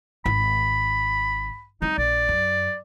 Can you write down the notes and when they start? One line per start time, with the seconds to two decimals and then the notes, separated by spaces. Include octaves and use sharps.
0.26 G#1 B5
1.82 G3 C4 D#4
1.98 A#1 D5
2.29 F#2